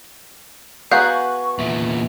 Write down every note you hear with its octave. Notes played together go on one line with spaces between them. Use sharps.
B3 F#4 G#4 F5 A#5 F#6 G6
C#6
E2 A#2 E5